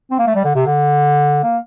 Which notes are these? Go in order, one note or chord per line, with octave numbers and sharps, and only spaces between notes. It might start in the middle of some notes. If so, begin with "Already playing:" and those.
C4
A#3
A3
G3
D3
C3
D3
A#3